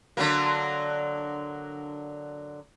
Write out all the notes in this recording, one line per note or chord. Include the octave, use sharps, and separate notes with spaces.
D3 F#3 A#3